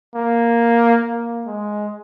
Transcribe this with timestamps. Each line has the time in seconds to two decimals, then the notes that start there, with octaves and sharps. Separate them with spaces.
0.15 A#3
1.02 A#3
1.47 G#3